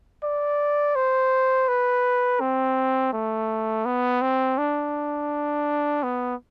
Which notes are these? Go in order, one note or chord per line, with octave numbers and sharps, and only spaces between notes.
D5
C5
B4
C4
A3
B3
C4
D4
B3